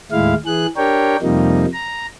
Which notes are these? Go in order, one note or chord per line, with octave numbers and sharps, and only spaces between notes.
D#2 A2 G#3 E4 F5
E3 G#4 F#6
D4 G4 A#4 C#5 G5
F2 C3 F3 G3 A#3 D#4
A#5